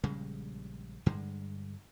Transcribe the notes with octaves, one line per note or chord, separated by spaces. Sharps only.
A#1 C#3 G3 G#3
G2 D3 G3 G#3